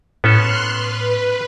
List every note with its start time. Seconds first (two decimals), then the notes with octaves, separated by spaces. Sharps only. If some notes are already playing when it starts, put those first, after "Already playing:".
0.24 A2 B3 C#4 A4 C6 F6 F#6
0.74 B4